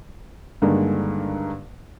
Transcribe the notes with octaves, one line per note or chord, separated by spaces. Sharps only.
G2 D3 D#3 G#3 A#3